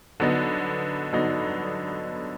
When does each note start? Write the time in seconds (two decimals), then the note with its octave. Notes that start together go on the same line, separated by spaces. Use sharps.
0.20 D3 F#3 B3 D#4
1.13 D3 F#3 B3 D#4